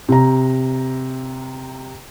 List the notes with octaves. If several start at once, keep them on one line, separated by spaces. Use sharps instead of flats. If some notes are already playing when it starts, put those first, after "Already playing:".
C3 A#5